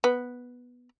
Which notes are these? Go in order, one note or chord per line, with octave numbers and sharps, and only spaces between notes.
B3